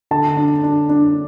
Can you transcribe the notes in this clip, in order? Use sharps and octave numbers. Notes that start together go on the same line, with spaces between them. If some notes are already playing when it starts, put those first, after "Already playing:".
D3 A5
D4
D4
D4